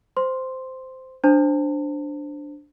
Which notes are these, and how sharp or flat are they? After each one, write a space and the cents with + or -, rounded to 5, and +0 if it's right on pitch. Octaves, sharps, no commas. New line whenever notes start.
C5 -10 C6 +0
D4 +0 C5 +0 A5 +35